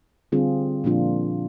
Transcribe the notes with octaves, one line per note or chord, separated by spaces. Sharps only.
D3 G3 C4 F4 G#4
A#2 F3 A#3 D4 F4